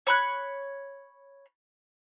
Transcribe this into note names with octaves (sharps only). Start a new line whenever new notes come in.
C#5 B5 F#6